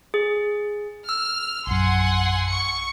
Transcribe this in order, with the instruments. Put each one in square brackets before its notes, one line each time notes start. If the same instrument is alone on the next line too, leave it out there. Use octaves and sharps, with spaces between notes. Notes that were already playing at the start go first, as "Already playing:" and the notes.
[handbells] G#4
[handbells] E6 [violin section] F6
[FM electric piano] A#1 F#2 [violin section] F#5 G#5 C6
[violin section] C#6 C#7